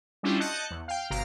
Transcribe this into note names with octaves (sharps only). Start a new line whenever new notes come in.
G3 C#4 D4 E4 F4 G4
D#5 A5 F#6 G6 C#7
E2
F5 G5
G1 B2 F5 A#5 A#6 D7